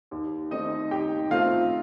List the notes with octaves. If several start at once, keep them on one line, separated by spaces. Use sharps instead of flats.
D#2
D#3 A3 C4 D#4 D#5
D#2 G4 G5
D#3 A3 C4 F4 F5